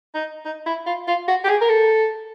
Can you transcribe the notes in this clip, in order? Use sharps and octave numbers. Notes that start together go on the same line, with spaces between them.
D#4
D#4
E4
F4
F4
F#4
G4
G#4
A#4
A4